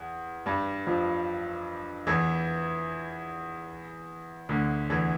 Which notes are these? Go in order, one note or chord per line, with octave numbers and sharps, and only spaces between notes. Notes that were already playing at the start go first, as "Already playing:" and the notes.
Already playing: E2
G2 G3
F2 F3
E2 E3
D2 D3
E2 E3